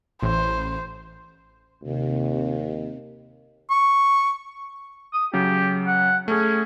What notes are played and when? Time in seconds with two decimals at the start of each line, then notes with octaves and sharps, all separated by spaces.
0.23 A1 C5
1.83 D#2 C3
3.71 C#6
5.14 D#6
5.33 C#3 F#3 G4
5.87 F#5
6.28 A3 C#4 G#4